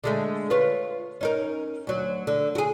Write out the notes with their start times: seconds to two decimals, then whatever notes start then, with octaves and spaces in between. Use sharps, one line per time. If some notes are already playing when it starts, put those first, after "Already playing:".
0.04 D3 G#3 A3
0.50 F4 B4 C#5
1.21 C#4 D#4 A#4
1.87 D2 F#3
2.27 D3
2.55 F#4 G#4